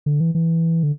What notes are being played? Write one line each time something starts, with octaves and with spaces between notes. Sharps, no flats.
D3
E3
E3
D3